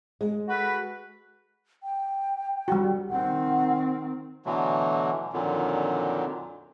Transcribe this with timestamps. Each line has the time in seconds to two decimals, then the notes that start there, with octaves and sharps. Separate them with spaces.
0.21 G#3
0.48 F#4 A4 B4
1.83 G5
2.68 G3 F#4
3.10 D#3 C4 F#5
4.46 B2 D3 E3 F#3 A3
5.33 F2 A#2 D3 D#3 F#3